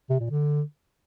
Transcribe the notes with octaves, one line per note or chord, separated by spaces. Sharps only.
C3
A#2
D3